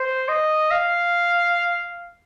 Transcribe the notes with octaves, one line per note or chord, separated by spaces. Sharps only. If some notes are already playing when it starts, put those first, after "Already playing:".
Already playing: C5
D#5
F5